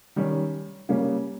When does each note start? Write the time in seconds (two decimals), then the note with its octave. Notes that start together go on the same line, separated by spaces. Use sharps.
0.16 D#3 G3 C#4
0.89 C#3 G3 A#3 C#4